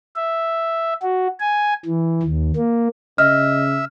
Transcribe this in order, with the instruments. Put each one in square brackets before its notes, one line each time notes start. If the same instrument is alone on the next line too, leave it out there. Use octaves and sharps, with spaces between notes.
[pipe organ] E5
F#4
G#5
E3
D#2
A#3
[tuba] C#3 [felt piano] D#5 [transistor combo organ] E5 [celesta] F6